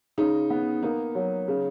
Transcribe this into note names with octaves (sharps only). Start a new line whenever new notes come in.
C#3 D#4
B3
A#3 D#4
F#3
C#3